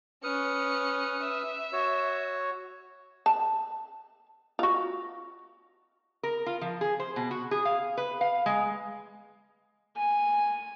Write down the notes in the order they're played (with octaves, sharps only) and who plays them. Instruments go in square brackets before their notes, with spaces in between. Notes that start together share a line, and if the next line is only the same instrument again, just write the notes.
[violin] C#4 C#7 [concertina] B4 D#6 F6
[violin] E5
[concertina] F#4 C#5
[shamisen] A5
F4 F#4
[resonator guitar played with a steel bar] A#4
F4
F3
G#4
C5
B2
F#4
G#4
F5
B4
F5
G#3
[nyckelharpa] G#5